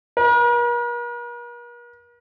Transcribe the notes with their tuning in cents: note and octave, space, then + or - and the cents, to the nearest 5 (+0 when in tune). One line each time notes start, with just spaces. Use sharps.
A#4 +45